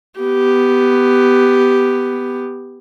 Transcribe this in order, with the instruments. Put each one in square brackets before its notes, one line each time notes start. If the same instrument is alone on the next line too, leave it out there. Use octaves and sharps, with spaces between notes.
[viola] B3 G4